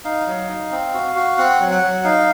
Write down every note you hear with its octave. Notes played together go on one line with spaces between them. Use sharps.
D#4 F5
F#3
D#4
C4
F#4
F#4
C4 F#5
F#3
F#5
F#3
D#4 F5